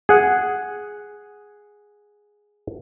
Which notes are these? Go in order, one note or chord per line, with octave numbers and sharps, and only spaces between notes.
G#4 F#5